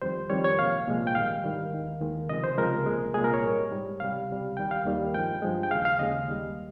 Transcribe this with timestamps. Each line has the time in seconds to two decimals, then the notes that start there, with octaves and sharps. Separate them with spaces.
0.02 F2 D#3 G3 C5
0.30 F2 D#3 G3 C#5
0.44 C#5
0.58 C2 A#2 F3 G#3 F5
0.87 C2 A#2 F3 G#3
1.07 G5
1.15 G#2 D#3 G3 F5
1.44 G#2 D#3 G3
1.73 D#2 D#3 G#3
2.00 D#2 D#3 G#3
2.29 C#2 C3 F3 G#3 D#5
2.44 C5
2.58 C#2 C3 F3 G#3 A#4
2.86 C2 A#2 G#3
3.14 C2 A#2 G#3 G#4
3.24 A#4
3.34 C#5
3.43 G#2 G3
3.71 G#2 G3
4.00 C#2 C3 G3 F5
4.28 C#2 C3 G3
4.57 D#2 D#3 G3 G5
4.71 F5
4.85 D#2 D#3 G3
5.14 G2 F3 G#3 G5
5.42 G2 F3 G#3
5.63 G5
5.71 D#2 C#3 G#3 F5
5.85 F5
5.99 D#2 C#3 G#3 D#5
6.28 D#2 D#3 G3